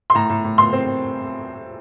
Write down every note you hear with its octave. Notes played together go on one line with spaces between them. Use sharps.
C6
A2 A#5
A2
A2
A2 C6
C4